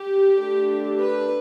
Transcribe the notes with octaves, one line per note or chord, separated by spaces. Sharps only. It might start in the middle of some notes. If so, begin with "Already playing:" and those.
Already playing: G4
D3 A3 D4
B4